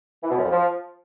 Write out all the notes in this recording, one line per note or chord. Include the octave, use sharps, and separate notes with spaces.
E3
B2
F#2
F2
F3